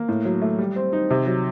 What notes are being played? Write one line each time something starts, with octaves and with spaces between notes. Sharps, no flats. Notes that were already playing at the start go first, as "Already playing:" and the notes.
Already playing: A#3
A2
F#3
A3
G3
C4
D#4
C3
F#3